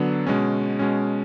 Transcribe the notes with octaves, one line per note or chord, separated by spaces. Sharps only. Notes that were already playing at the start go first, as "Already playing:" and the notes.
Already playing: D3 F#3 B3 D4
B2 G#3 C#4
B2 G#3 C#4